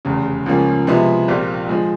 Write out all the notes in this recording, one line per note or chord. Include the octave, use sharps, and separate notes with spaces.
F1 E2 C#3
C#2 C#3 F3 A#3 C#4
C3 F3 G#3 B3 E4
A#1 A#2 G3 C4 F4
D3 F3 G#3